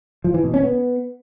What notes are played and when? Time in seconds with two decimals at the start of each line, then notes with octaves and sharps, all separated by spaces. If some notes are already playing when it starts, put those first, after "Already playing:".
0.24 F3
0.34 E3
0.44 B2
0.54 C#4
0.63 B3